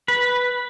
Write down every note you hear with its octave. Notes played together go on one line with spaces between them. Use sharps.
B4